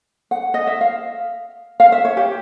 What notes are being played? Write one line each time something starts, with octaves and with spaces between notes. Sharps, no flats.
F#5
D#5
E5
F5
F5
E5
C#5
G4